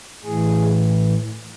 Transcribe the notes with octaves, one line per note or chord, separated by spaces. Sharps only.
A2 E3 G#4